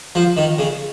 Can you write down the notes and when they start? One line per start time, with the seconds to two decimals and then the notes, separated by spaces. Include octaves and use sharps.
0.15 F3
0.37 D#3
0.59 C#3